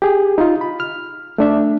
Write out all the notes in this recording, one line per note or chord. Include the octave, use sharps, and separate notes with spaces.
G4 G#4
D#4 F4
B5
F6
A3 D4 E5